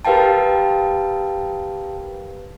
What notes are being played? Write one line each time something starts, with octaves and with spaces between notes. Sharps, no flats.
G4 A#4 B4 F5 G5 A5